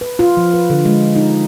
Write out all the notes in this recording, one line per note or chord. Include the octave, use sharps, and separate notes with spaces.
B4
F4
F3
B4
D3
G#3
D#4